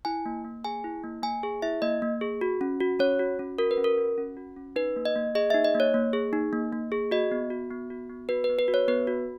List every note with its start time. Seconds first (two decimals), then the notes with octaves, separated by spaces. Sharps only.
0.05 E4 G#5
0.26 A#3
0.45 A#3
0.64 G#4 G#5
0.84 E4
1.04 A#3
1.23 A#3 G#5
1.43 G#4
1.62 E4 E5
1.82 A#3 D#5
2.02 A#3
2.21 G#4
2.41 F#4
2.61 C#4
2.80 F#4
2.99 C#4 C#5
3.19 F#4
3.39 C#4
3.58 F#4 A#4
3.71 B4
3.78 C#4
3.84 A#4
3.98 F#4
4.18 C#4
4.37 F#4
4.56 C#4
4.76 D#4 B4
4.96 A#3
5.05 D#5
5.16 A#3
5.35 G#4 D#5
5.50 E5
5.54 D#4
5.65 D#5
5.75 A#3
5.80 C#5
5.94 A#3
6.13 G#4
6.33 D#4
6.53 A#3
6.73 A#3
6.92 G#4
7.11 F#4 D#5
7.31 B3
7.50 F#4
7.71 B3
7.90 F#4
8.10 B3
8.29 F#4 B4
8.44 B4
8.49 B3
8.59 B4
8.68 F#4
8.74 C#5
8.88 B3 B4
9.07 F#4